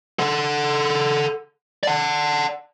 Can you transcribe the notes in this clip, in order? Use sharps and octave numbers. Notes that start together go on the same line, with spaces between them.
A4 F#5
D5 F#5